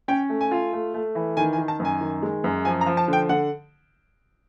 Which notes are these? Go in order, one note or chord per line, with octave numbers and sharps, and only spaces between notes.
C#4 G5
A3
G#5
F4
A3
A3
E3
D#3 G#5
G#5
D#3
A5
F#2
G#5
D#3
G#3
F#2
F3 G#5
A#5
F3
A5
D3 G5
D3 F#5